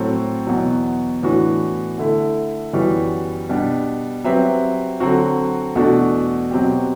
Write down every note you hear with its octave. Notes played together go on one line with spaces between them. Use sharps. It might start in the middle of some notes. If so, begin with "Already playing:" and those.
Already playing: A2 F#3 C4 F#4 A4
E2 B2 F#3
A2 E3 B3 D4 F#4
D3 A3 E4
F#2 E3 G3 B3 F#4
B2 G3 D4
F#3 C4 G4 B4 E5
D3 F#3 C4 F#4
E2 B2 A3 D4 F#4
B2 F#3 C4 G4